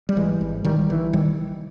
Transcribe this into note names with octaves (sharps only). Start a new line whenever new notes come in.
G3
G#1 E3 G#3
G#1
A#1 D#3 G3
A#1 E3
D#3 G3